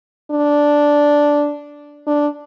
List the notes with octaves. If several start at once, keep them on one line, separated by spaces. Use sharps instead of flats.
D4
D4